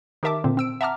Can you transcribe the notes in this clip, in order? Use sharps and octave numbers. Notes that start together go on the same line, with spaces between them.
D#3 G4 A#4 E5 A5 D6
A#2 D3 C4
C4 E6 D7
E5 F#5 A5 A#5 D6 F6